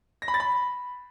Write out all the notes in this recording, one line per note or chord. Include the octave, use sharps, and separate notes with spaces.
A#6
B5
A6
B5